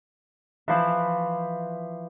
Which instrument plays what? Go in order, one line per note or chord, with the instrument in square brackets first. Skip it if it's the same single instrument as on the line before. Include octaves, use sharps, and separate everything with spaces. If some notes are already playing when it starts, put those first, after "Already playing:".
[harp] E3 F3 E4